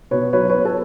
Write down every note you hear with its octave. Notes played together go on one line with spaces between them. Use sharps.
B2 B4 C#5
F#3 B4 C#5
B3 B4 C#5
A4